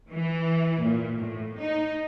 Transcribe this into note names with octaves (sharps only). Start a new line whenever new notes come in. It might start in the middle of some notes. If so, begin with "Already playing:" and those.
E3
A#2
A2
D#4